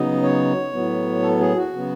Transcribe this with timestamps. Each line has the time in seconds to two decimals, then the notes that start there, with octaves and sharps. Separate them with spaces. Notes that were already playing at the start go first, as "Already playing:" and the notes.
Already playing: C#3 F#3 B3 D#4 D#5
0.22 C#5
0.73 A2 F#3 B3
1.22 A4
1.40 G#4
1.56 F#4
1.74 C#3 F#3 B3